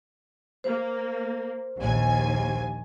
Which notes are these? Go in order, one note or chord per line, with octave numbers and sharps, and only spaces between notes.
A#3 C5
A#1 D#2 G#5